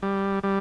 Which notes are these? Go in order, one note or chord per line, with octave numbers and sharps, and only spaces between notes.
G3
G3